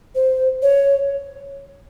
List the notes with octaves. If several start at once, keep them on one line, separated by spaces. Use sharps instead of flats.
C5
C#5